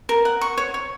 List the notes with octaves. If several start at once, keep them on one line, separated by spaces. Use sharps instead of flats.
A#4
F#5
C#6
C#5
C#5